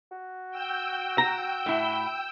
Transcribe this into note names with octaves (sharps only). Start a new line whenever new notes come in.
F#4
G5 E6 G6
A#5
A2 E4